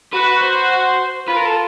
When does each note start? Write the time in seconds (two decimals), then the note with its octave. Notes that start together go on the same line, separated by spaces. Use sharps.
0.13 F#4 B4
0.41 C5
1.27 F4 B4
1.36 A#4
1.45 A4